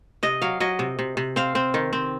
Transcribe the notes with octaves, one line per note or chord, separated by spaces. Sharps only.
C3 D#5
F#3 F5
F#3 D#5
C3
C3
C3
C4 F5
C4
D#3
C4